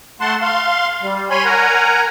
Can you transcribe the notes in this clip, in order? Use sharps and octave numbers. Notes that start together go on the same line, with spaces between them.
A3 F#5 A5 C6
F5 C6
G3
C#5 G#5 B5 C6
A#4 F#5 G#5 A#5